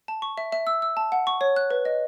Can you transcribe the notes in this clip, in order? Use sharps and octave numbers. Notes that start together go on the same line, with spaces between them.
A5
C#6
E5
E5
E6
E6
A5
F#5
C#6
C#5
F#6
B4
D#5